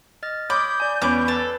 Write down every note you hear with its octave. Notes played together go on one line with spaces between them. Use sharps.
D#5 F6 A6
C#5 B5 D6 D#6 G6
D5 G#5
E2 C#4 B4 B5 D6
A4 B4 A6